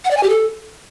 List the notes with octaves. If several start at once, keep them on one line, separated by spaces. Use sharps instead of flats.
F#5
D5
G#5
G4
A4